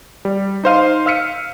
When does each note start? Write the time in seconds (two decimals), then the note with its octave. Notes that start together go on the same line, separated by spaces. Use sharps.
0.25 G3
0.64 D#4 C5 F5 D#7
1.06 F5 E6 F6 B6 C#7 D#7